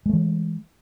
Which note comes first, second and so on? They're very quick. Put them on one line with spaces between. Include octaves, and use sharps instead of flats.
G#3 A3 E3